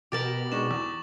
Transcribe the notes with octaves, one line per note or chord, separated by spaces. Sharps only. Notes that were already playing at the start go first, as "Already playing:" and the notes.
B2 G4 A#4 A5 D6 A6 F#7
G#3 D4 D#4 C#6 E7
E2